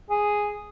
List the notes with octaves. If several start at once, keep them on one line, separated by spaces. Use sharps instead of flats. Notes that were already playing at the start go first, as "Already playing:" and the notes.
G#4